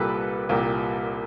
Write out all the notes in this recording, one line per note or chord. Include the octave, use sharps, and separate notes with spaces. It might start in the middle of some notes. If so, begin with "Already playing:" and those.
Already playing: C2 A#2 G3 A4 B4
C2 A#2 G3